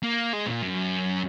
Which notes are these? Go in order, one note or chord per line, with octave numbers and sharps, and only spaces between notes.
A#3
G#3
A#2
F#2